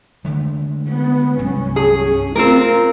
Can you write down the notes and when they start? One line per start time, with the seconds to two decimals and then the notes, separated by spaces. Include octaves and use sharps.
0.24 D3 G#3 A3
0.88 B3
1.39 C2 G2 F#3 C#4
1.76 G#4
2.36 A3 C4 F4 A#4